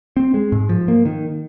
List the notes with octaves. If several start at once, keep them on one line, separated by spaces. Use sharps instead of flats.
C4
G#3
G#2
F3
A#3
D#3